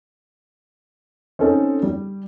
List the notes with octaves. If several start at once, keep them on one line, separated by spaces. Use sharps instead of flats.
C4 C#4 D#4 A4
G3